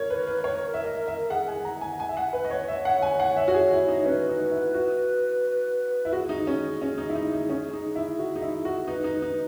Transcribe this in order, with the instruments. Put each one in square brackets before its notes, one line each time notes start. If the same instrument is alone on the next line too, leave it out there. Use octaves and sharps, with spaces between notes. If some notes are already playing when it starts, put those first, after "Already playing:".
Already playing: [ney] A#4 [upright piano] C#5
[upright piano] B4
B4
C#5
E5
D#5
E5
[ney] G#4 [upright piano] F#5
[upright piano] G#5
A#5
G#5
G#5
E5
F#5
B4
D#5
C#5
[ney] C#5 [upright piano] E5
[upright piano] F#5
G#5
F#5
E5
F#4
G#4
E4
D#4
[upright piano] C#4 [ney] B4
[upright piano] D#4
E4
F#4
E4
[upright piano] F#4 [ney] G#4
[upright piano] D#4
C#4
C#4
D#4
E4
D#4
D#4
C#4
D#4
E4
F#4
D#4
E4
F#4
[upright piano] D#4 [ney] B4
[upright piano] D#4
D#4